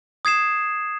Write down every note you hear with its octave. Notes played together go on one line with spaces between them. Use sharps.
D#6 G#6 C7 E7